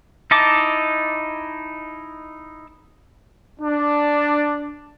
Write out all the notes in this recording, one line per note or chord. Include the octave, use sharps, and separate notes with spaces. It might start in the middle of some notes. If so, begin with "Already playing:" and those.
D#4 E4 D#5 A5 D6
D4